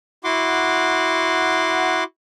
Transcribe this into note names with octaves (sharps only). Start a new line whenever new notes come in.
E4 F#4 F#5 C6 D6